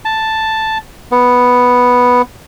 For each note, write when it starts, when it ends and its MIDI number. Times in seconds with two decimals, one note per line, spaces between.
0.05 0.78 81
1.12 2.22 59